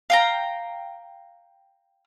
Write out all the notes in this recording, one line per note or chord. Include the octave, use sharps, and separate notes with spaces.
F5 G5 A#5